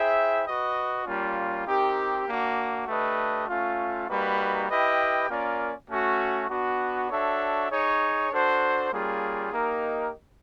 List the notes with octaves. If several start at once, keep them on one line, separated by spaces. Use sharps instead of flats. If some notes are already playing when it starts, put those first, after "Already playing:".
Already playing: E4 G#4 C5 E5 G5
F#4 B4 D#5
G3 A#3 C#4 F4
C4 D#4 G4 A#4
A#3 D4 F#4
A3 D4 G4 B4 D#5
A3 C#4 F4
G3 A#3 D#4 F#4 B4
E4 G4 B4 D#5 G5
A#3 C#4 F4 A#4 D5
A3 C#4 F#4
B3 D4 F#4
D4 F#4 A4 C#5 E5
D#4 G#4 C#5
D4 F#4 A4 C5
G3 A#3 C#4 F4 G#4
A#3 D#4 G4 A#4 D#5